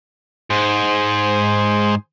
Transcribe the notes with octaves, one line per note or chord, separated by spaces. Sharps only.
G#2 G#4 C5